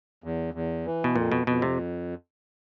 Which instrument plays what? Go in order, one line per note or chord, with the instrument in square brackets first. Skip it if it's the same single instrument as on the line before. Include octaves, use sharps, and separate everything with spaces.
[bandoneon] E2
E2
E3
[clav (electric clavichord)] B2
[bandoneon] F2 [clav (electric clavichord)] A#2
[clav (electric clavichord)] B2
[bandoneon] F2 [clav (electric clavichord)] B2
[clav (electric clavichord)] C3